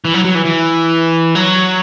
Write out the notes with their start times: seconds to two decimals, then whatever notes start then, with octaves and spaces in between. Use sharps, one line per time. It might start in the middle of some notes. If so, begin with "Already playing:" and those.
0.05 E3
0.14 F#3
0.25 F#3
0.35 E3
0.45 E3
1.35 F#3